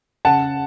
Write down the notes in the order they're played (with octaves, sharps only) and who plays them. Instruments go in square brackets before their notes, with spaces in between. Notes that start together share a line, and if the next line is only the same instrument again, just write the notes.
[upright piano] C#3 F#5 A5